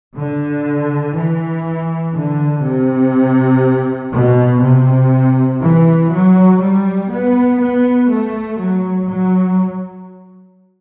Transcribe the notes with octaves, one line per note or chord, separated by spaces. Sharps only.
D3
E3
D3
C3
B2
C3
E3
F#3
G3
B3
B3
A3
F#3
F#3